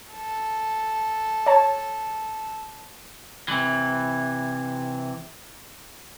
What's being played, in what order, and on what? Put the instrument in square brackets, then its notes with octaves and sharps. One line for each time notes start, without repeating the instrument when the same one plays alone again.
[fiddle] A4
[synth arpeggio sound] C#5 A5
[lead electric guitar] C3 E3